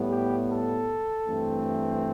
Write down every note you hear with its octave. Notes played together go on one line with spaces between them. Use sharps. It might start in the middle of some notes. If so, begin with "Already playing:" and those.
Already playing: A2 G3 B3
G4
A4
G2 E3 A3 C4